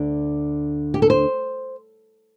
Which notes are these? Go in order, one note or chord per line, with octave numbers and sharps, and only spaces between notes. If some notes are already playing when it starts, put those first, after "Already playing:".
Already playing: D2 D3 D4
G4
A4
C5